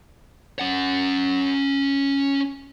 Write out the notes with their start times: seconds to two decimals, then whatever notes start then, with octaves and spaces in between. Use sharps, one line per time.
0.59 C#4 F#5